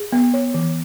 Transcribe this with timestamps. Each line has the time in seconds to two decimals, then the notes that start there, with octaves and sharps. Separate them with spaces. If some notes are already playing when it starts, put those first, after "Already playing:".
Already playing: G#4
0.12 B3
0.34 C#5
0.54 E3